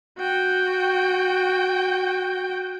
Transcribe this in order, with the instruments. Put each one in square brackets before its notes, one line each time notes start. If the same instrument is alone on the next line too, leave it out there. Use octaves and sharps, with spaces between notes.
[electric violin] F#4 G5